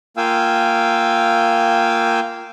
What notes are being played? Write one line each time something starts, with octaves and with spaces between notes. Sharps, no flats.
A#3 F4 F5 G5 G#5 E6